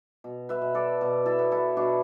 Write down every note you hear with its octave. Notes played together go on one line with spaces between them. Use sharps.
B2
B4 E5
B2
A4 D5
B2
E4 A4
B3
E4 A4
B2 D4 F#4